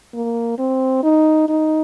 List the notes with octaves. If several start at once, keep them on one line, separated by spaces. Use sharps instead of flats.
A#3
C4
D#4
D#4